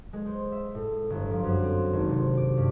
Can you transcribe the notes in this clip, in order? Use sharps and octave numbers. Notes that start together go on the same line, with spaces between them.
G#3
C5
E5
A2
G1
F3
F#2
C4
G#1
C3
D6
G2